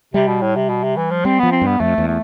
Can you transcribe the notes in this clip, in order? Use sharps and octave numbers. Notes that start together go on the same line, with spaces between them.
C3 G3
B2
A2
C3
B2
C3
E3
F3
G3 C4
F3 B3
C4
G2 B3
F2 A3
E2
A3